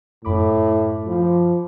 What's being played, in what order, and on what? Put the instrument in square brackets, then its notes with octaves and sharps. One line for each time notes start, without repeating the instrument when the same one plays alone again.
[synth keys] F#2 B5 D6 [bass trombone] A2
[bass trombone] F3